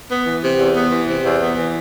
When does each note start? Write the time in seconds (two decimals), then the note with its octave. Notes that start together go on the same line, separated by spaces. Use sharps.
0.09 B3
0.26 E3
0.42 C3
0.59 E2
0.75 B3
0.91 E3
1.08 C3
1.25 E2
1.41 B3
1.57 E3